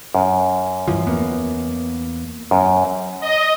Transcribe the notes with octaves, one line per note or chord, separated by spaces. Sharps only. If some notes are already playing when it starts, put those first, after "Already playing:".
F#2
G2 E3 F3
E2 A#3 B3
F#2
D#5